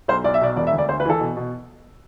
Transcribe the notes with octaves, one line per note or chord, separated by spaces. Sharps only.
B1 C5
B1 D5
E5
B2 D5
E1 D5
E5
D2
D5
D2 C5
B4
E3 A4
B2
B2